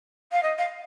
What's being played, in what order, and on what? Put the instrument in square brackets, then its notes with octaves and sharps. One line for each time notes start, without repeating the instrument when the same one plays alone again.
[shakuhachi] F5
D#5
F5